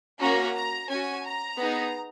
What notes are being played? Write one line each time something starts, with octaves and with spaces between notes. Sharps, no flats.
A#3 C#4 F#4 A#5
A#5
C#4 F#4 G#5
A#5
B3 D#4 G#4